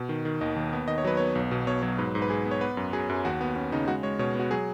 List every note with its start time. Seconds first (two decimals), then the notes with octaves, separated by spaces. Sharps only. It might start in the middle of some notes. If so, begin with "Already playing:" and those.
Already playing: B2
0.09 D#3
0.25 D#3
0.41 D#2 D#5
0.56 D#2
0.73 B3
0.88 D#3 D#5
0.98 C#5
1.05 F#3 B4
1.17 B3 C#5
1.35 B1
1.51 B2
1.67 B2 C#5
1.83 F#3 C#5
1.98 G#2 B4
2.15 G#2
2.22 B4
2.30 G#2 G#4
2.45 B3
2.51 C#5
2.61 B3 B4
2.77 F#2
2.93 F#3 G#4
3.09 F#2 G#4
3.25 D#2 F#4
3.41 B3
3.56 B3 C#4
3.72 C#3 D#4
3.88 G#3 F#4
4.03 G#3 C#5
4.19 B2 C#5
4.35 B3 F#4
4.51 F#3 G#4